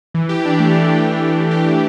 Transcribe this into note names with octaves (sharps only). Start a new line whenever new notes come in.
E3
G4
D4
A3
E3
G4
D4
A3
E3
G4
D4